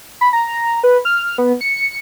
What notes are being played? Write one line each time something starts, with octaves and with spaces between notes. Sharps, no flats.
B5
A#5
B4
F6
B3
C#7